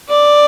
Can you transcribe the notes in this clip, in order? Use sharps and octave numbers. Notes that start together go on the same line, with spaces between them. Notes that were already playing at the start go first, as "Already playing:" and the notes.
D5